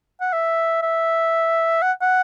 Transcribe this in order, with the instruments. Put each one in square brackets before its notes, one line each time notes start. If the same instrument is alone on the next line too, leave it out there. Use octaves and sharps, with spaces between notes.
[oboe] F#5
E5
E5
F#5
F#5